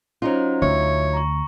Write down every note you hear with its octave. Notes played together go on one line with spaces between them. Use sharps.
F#3 C#4 D#4 F4 C5
D2 C#5 E5
A#5 C#6